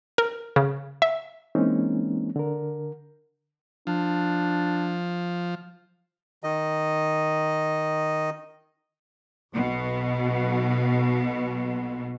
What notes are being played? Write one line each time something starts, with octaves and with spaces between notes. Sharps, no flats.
A#4
C#3
E5
E3 G#3 A#3 C4 C#4 D#4
D3 A#4
F3 D4
D#3 D#5
B1 B2